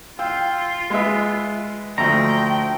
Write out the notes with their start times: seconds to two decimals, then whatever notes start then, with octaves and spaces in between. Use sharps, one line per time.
0.19 F4 F5 G5 E6
0.90 G#3 B4 E5
1.98 D2 F3 A3 G5 A#5